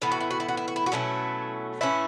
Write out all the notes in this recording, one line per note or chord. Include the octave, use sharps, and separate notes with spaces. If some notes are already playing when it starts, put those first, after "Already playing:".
A2 E3 B3 E4
F#4
E4
F#4
E4
F#4
E4
F#4
E4
F#4
B2 F#3 A3 C#4 E4
A2 E3 A3 C#4 E4